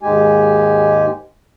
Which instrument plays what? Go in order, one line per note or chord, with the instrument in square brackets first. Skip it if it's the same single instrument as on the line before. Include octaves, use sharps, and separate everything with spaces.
[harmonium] D#2 G#2 G#3 G4 G#5